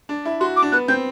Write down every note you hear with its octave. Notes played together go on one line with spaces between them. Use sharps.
D4
E4
F#4 C6
D6
D4
B3 F#6
C4 G6